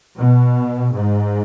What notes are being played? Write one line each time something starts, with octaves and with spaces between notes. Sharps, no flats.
B2
G#2